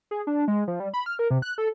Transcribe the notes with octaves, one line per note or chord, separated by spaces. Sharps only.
G#4
D4
G#3
F3
G3
B5
F6
A#4
C3
F#6
A4